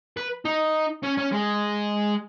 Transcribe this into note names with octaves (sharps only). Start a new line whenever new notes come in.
B4
D#4
C#4
C#4
G#3